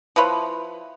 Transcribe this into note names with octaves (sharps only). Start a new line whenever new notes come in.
F3 E4 B4 C#5